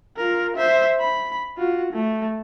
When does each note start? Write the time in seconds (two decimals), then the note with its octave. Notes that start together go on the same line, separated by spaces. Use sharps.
0.17 F4 A#4
0.57 C5 E5
1.00 B5
1.58 F4 F#4
1.93 A3